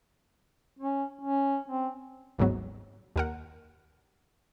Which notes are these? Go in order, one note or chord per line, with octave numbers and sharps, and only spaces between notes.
C#4
C#4
C4
G1 D2 G#2 F#3 B3
D#2 A#4 F#5